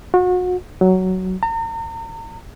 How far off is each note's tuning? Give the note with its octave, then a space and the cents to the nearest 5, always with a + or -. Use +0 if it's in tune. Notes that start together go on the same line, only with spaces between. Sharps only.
F#4 -35
F#3 +10
A#5 -40